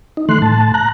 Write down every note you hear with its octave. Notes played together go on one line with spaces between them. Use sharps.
D#4
D#3 E3 A3 C6 F#6
A2 A5
A#5 F#6